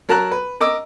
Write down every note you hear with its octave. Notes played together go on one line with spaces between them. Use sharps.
F#3 A#4 A5 A#5 F#6
B4
A#4 D#5 D6 E6